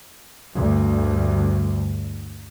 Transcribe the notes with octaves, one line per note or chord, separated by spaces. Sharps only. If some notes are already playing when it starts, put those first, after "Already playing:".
D2 G2